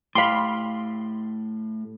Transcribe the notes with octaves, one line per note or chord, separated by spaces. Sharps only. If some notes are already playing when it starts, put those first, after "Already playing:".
A2 G4 F5 B5 C6